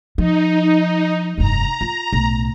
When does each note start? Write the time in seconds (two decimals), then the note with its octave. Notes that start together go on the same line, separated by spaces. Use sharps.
0.18 F3 D#4
1.38 F1 G2 A#5
1.81 F4
2.13 B1 A2